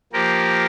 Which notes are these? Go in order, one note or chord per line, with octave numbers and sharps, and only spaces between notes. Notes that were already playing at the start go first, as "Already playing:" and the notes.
F3 A#3 G4 A#4